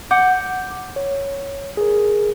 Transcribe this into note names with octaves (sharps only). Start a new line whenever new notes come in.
F#5 D6 G6
C#5
G#4 A#4